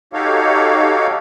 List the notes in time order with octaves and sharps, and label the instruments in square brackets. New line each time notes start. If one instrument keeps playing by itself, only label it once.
[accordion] D#4 F#4 G4 A4 C#5 F5